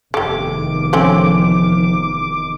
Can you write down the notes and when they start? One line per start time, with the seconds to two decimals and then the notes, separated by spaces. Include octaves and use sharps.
0.14 F1 E2 D#3 A3 G4 D6
0.93 F3 A3 C4 C#4